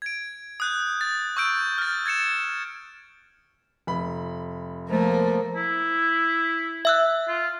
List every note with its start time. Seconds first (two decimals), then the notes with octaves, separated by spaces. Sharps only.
0.02 G#6 D7
0.60 D#6 F#6 G6
1.01 A6
1.37 C#6 E6 G6 D7
1.78 F6 A6
2.06 G#6 A6 C#7 E7
3.87 F1 B5
4.89 F3 A3 A#3
5.56 E4
6.85 E5 E6 F#6
7.28 F4